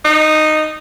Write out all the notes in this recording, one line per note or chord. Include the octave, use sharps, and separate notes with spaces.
D#4